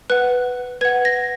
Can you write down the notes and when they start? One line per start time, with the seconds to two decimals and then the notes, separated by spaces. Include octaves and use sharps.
0.10 B4 F#5 F#6
0.81 B4 F#5 G#6
1.05 A#6